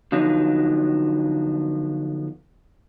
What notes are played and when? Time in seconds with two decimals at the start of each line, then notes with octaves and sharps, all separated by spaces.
0.12 D3 F3 F#3 B3 D#4